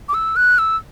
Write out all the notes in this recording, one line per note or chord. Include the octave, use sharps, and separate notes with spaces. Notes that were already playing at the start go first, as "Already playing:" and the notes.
D6
E6
F#6
E6